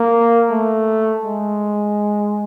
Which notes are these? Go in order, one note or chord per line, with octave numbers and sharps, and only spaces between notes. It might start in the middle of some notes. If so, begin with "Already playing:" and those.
Already playing: A#3
A3
G#3